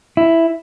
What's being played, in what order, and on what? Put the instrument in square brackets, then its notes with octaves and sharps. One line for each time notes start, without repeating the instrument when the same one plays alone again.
[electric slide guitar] E4